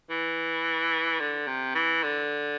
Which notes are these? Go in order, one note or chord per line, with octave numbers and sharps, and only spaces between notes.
E3
D3
C3
E3
D3